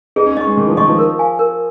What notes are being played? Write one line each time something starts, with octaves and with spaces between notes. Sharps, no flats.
D#4 G#4
C#4
C#4 D#5 C#6
G#3
D#3 G#4
F3
D#3 D#5 C#6
F3
A#4
F5 G#5
A#4